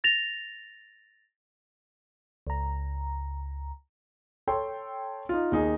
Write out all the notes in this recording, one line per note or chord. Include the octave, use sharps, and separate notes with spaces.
A6 A#6 F7
C#2 A#5
A4 C#5 G5 C6
D#4 F4
D#2 D#4 G#4